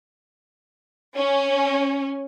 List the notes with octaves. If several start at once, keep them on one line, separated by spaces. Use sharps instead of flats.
C#4